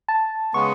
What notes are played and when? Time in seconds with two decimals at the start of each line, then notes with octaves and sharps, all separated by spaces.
0.08 A5
0.54 C#3 G#3 B3 C#6